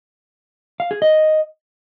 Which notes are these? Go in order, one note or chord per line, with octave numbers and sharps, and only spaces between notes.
F5
G#4
D#5